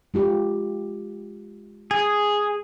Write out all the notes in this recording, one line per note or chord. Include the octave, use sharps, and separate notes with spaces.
G#3 F4 G4
G#4